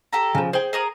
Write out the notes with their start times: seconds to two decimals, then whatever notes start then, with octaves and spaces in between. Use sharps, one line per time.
0.13 G4 A4 A#5
0.35 C#3 F3
0.53 G#4 C5 G5
0.73 G#4 A#4 D#6